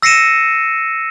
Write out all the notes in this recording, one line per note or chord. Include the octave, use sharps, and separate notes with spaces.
E6 A#6 C7 C#7 D#7 E7